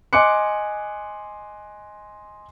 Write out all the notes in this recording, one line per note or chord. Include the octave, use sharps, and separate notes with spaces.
D#5 G#5 C6 D6 F#6 C#7